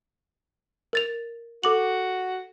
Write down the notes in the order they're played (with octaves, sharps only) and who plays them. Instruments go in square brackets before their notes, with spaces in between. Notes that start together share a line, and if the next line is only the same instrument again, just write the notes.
[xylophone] A#4 A6 F7
[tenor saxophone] F#4 [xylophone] A4 D6 F#7